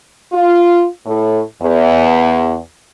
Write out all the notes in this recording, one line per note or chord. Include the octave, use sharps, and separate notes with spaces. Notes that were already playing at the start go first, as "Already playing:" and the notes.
F4
A2
E2